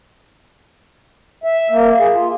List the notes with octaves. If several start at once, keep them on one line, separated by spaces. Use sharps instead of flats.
E5
A#3
G#4
F4